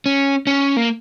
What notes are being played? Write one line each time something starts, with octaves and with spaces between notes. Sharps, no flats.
C#4
C#4
A#3